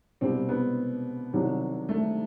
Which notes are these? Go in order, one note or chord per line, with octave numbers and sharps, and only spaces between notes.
C2 B2 G3 C4
B3
C2 C3 D#3 F#3
A3